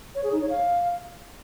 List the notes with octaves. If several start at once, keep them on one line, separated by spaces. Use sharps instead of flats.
C#5
G#4
D#4
C#5
F5